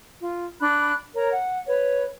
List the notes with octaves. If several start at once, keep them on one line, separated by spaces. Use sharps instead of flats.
F4
D4 B5 F#6
A#4 C#5 A#5
F#5
B4 C#5